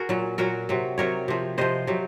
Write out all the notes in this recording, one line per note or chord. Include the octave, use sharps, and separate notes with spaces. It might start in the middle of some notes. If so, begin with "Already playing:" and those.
Already playing: F#4 G#4 A#4
A#2 F#3
A#2 F#3 F#4 A#4
C3 F#3
C3 F#3 A#4 C#5
C3 F3
C3 F3 C5 D#5
C3 F#3